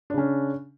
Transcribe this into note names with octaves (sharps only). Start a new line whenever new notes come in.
C#3 C#4 D4